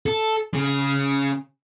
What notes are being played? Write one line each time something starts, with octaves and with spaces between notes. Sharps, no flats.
A4
C#3